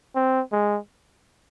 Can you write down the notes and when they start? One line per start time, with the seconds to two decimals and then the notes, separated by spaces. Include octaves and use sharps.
0.15 C4
0.52 G#3